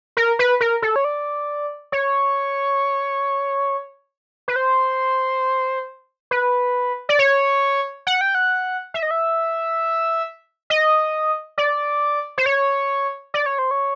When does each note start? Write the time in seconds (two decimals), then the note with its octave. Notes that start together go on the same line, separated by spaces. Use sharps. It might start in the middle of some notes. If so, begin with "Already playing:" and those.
0.17 A#4
0.39 B4
0.60 A#4
0.82 A4
0.96 C#5
1.05 D5
1.92 C#5
4.48 B4
4.56 C5
6.31 B4
7.09 D5
7.19 C#5
8.07 F#5
8.21 G5
8.35 F#5
8.94 E5
9.03 D#5
9.11 E5
10.70 D#5
11.58 D5
12.38 C5
12.46 C#5
13.34 D5
13.46 C#5
13.59 C5
13.71 C#5